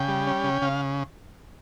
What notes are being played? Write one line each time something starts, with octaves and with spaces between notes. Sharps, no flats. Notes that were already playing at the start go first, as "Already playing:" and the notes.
Already playing: C#3 G5
G3
C#4
C#3
C#3 F5